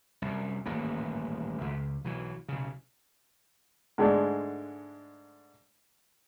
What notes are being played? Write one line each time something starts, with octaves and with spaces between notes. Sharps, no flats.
C2 F#2
D#1 A1 G#2 A#3
C#2
B1 E3 F#3
B1 C#3
G#2 D3 G#3 A3 D4